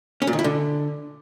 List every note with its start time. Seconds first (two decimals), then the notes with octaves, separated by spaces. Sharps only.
0.22 C#4
0.27 A#2
0.33 D#3
0.39 E4
0.44 D3